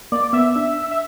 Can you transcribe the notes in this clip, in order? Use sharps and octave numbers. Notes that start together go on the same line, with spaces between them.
A#3 D5
B3 E5
D4 E5
E5